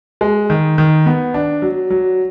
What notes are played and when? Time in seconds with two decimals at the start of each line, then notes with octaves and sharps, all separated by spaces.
0.21 G#3
0.50 D#3
0.78 D#3
1.06 B3
1.34 D4
1.62 F#3
1.90 F#3